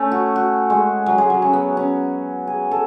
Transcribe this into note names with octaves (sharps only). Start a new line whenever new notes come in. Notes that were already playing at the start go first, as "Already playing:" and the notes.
Already playing: A3 C#4
F#4
F#4
G#3
F#3
G#3
F#3
C#4
B3
C#4
G#4
A4